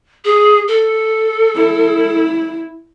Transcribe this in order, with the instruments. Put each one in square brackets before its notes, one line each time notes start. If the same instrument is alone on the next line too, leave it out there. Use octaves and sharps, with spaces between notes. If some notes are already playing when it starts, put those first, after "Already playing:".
[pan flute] G#4
A4
[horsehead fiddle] E4